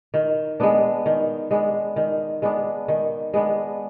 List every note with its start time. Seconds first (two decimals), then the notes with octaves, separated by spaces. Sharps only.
0.14 D#3
0.60 G#3 B3 D4
1.06 D#3
1.51 G#3 B3 D4
1.96 D#3
2.42 G#3 B3 D4
2.88 D#3
3.34 G#3 B3 D4